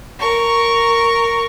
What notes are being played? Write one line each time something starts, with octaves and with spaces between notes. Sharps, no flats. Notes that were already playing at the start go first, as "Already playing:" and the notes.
A#4 C#6